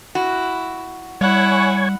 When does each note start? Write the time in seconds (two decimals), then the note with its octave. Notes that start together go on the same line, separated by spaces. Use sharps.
0.15 E4 F#4
1.21 G3 E4 C#5 F#5 G#5